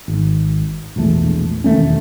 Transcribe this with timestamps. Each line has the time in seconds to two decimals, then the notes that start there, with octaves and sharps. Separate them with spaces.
0.08 G#1
0.96 E1 A#1 E2 A3
1.64 E1 D#2 A3 C#4